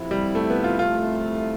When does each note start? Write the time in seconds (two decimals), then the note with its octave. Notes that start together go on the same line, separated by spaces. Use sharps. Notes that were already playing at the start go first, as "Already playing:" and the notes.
Already playing: F2 C3 F3 C4 E4
0.11 G3
0.35 A3
0.50 B3
0.64 F4
0.79 C2 C3 F3 A3 E4 F4